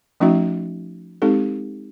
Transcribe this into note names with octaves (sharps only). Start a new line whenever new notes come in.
F3 A3 C#4 D#4 F#4 E5
G#3 C4 D#4 G4 A4